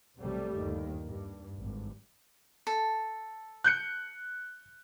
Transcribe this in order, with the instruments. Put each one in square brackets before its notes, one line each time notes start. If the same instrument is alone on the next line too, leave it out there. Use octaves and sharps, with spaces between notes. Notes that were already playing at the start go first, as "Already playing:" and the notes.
[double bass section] B1 C3 F#3 G3 A3
G1 D#2 D#3
G2
G#1 G2
[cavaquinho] A4
[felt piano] F#6 G6 C#7